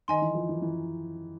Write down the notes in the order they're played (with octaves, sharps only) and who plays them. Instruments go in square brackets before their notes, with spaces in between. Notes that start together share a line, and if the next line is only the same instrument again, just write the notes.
[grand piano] D#3 [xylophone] D#5 G#5 C6
[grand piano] E3
F3
E3
E3